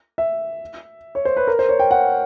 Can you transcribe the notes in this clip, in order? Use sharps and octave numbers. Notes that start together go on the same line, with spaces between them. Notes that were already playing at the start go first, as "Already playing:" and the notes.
E5
C#5
C5
B4
A#4
C5
C#5
G5
F#5